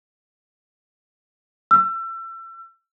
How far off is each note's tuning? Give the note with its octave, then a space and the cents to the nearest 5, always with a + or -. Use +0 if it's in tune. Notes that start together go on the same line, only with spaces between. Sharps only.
E6 +30